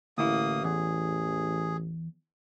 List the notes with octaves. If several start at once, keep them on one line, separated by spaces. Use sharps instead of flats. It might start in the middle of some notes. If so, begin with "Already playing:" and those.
A1 D2 A#3 E4 D#6
E2 G#4